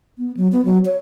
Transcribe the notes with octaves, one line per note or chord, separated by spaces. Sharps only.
B3
F#3
B3
F#3
C#5